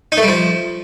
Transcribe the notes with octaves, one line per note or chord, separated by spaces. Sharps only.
D#4
A3
G3
F3